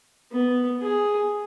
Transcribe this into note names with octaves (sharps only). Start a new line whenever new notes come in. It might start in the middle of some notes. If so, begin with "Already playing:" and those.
B3
G#4